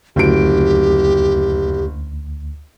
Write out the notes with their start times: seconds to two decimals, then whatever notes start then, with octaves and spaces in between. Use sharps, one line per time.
0.16 F#1 D2 F#3 G4 D7